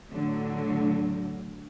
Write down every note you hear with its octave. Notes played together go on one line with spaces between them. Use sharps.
A2 D3 F#3